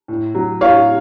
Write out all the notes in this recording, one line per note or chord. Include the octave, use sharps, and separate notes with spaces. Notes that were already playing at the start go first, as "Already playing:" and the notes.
A2
F#3
A2 C#5 F5